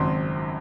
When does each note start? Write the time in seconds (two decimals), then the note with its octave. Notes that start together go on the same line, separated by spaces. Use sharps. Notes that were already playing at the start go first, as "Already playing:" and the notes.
Already playing: G#1 F#2 C#3 F#3 C4 C6